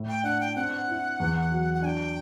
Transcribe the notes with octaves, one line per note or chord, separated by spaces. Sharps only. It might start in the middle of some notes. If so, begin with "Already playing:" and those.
Already playing: A2
G5
D4 F#5
G5
C4 F#5
E4
E2
F#3
F#5
D4 G5 G#5